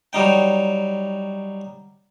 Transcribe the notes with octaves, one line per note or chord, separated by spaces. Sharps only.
F#3 G3 D#4 G5